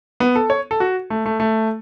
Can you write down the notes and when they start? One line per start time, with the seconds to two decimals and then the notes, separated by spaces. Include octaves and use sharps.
0.20 B3
0.36 A4
0.50 C#5
0.71 A4
0.80 F#4
1.10 A3
1.26 A3
1.40 A3